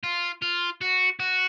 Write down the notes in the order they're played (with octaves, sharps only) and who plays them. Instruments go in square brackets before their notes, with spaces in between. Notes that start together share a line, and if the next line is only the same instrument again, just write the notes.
[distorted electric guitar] F4
F4
F#4
F#4